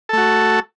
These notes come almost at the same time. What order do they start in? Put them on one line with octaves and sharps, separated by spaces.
A4 A3 F#4